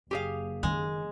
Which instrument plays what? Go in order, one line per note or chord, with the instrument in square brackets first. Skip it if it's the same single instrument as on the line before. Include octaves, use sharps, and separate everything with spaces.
[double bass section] F#1 [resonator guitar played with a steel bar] G4 G#4 F5
[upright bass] D#3 C#4 [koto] G#3